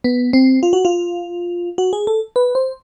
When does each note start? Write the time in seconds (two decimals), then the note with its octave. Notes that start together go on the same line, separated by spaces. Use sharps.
0.04 B3
0.33 C4
0.63 F4
0.73 F#4
0.85 F4
1.78 F#4
1.93 G#4
2.07 A4
2.36 B4
2.55 C5